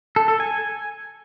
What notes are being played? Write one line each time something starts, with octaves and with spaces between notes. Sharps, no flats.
A4
A4
G#5